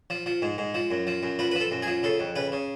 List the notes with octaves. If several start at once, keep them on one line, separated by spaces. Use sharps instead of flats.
F3
F3
G#2
G#2
F3
F#2
F3
F#2
F3 B4
B4
F3 A4
F#2
G#4
F3
C#3 A4
F2
C#3 B4
C#3